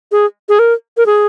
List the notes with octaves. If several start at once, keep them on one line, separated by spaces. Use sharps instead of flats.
G#4
G#4
A#4
A#4
G#4